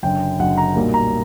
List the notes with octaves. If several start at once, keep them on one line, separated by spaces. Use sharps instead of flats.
F#1 F#2 D3 G5
F#1 F#2 D3 F#5
A#5
B1 A#2 G3 A#3
A#5